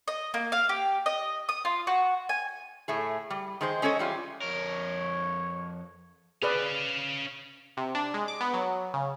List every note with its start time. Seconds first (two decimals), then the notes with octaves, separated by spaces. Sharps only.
0.08 D#5
0.34 A#3
0.52 F5
0.69 G4
1.06 D#5
1.49 D#6
1.65 F4
1.87 F#4
2.29 G#5
2.88 A2 A3 G#4
3.30 G3
3.61 D#3 G#3 C5
3.82 G#3 C#4 A4 C#5 D#5
3.99 E3 G3 F4
4.42 F2 A#4 C#5
6.42 C#4 G#4 B4 D5 F5
7.77 C3
7.95 D4
8.14 G#3
8.28 D6
8.41 B3
8.54 F#3
8.94 C#3